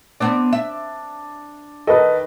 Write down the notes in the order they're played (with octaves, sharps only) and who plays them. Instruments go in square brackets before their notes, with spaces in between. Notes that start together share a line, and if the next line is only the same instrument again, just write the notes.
[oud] B3 C4 D5 [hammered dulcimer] D4
[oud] E5
[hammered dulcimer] D#3 [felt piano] A4 [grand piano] B4 D#5